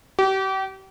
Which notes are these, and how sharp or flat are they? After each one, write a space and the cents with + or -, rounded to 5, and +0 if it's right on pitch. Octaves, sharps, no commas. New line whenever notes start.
G4 -35